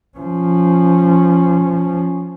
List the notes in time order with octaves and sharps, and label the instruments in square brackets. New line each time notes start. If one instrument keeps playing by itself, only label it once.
[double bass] F3 C#4